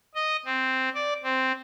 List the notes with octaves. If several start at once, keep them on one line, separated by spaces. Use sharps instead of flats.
D#5
C4
D5
C4